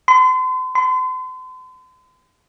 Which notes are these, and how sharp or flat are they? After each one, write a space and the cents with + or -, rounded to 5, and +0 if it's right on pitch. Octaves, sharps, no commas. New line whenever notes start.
C6 -40
C6 -40